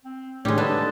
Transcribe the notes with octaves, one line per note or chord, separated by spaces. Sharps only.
C4
A2 D3 D#3 G3 G#3 C#5
B3 D4 D#4 A4 A5